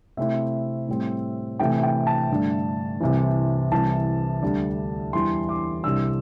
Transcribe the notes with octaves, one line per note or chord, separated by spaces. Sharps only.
C3 A3 C4 E4 E5
A2 G3 C4
C3 E3 A3 E4 G5
G5
A5
G2 D3 A3 D4
C2 C3 E3
C2 C3 E3 A5
D2 D3 G3 D4
E2 E3 G3 C6
D6
C2 C3 G3 D4 E6